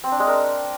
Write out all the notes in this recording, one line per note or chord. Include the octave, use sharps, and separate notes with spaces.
C4
D4
G#3
A#4